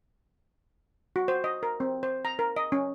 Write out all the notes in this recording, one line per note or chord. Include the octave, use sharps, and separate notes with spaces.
F#4
C5
D#5
A#4
C4
C5
A#5
A#4
D#5
C#4